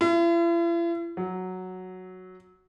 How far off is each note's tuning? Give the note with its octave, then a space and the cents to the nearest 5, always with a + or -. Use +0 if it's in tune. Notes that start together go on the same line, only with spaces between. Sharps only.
E4 +45
F#3 +0